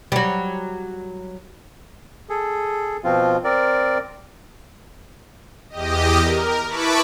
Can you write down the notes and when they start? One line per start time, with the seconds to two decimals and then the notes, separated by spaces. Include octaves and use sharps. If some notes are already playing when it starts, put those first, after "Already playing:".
0.12 F#3 G3
2.29 G#4 A4
3.04 B2 F3 C4 F4
3.44 C4 A#4 D5
5.70 E2 G4 D#5
6.20 A#4
6.67 E4 B4 A5 B5 C#6 D6